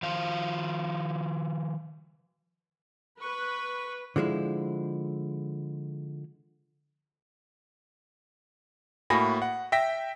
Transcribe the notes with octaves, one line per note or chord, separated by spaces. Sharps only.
D#3 F3 C5 F5
B4 C#6
D3 F3 G#3 E4
A2 A#3 F#4 G#5 B5 A#6
F#5
E5 G5 A#6 B6